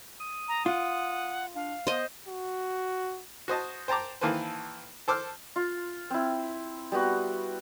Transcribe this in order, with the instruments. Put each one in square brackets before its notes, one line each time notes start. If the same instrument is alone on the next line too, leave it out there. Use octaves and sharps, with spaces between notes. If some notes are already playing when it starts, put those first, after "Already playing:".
[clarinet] D#6
[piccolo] A#5
[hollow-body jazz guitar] F4 [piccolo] F#5
[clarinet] D4 [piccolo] F5
[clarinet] B3 [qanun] C5 D#5
[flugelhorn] F#4
[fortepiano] F#4 C5 D#5 A5
C5 G5 A5 A#5 D6
D#3 E3 A#3 A4 B4 C5
A4 C5 D6 E6 F6
[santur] F4
C4 E4
G3 B3 F#4